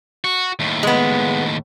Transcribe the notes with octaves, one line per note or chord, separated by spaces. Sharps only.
F#4
D#2 A2
G#3 B3